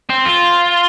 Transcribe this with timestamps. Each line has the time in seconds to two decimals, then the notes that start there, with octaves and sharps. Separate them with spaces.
0.10 C4
0.25 F4